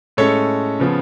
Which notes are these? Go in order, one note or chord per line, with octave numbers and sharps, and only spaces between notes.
A2 G#3 C#4 A4 C#5
C#3 F3 B3